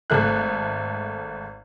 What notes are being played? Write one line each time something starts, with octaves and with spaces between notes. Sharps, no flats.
G#1 A3 F#6